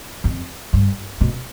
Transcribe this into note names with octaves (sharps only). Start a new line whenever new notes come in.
F2
G2
B2